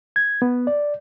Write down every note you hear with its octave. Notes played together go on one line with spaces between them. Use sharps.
G#6
B3
D5